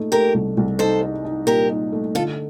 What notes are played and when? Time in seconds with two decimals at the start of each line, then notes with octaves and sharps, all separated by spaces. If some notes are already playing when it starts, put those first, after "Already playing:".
Already playing: A#2 A3 D#4
0.12 A3 G4 A#4
0.34 C2
0.57 C2
0.79 D#4 A4 C5
1.02 D#4
1.25 D#4
1.47 A#2 G4 A#4
1.70 D#4
1.92 A3
2.15 D3 F4 A4